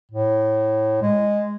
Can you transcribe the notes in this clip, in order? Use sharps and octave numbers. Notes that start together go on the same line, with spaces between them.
A2
G#3